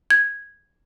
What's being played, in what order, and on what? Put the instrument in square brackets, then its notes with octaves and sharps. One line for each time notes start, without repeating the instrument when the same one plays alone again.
[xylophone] G#6